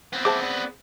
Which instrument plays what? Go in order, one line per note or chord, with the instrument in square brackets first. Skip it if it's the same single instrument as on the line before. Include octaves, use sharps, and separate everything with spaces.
[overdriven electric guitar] B3 C4
[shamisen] G#4 C5 A5 [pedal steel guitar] E5 D6
[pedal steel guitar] D5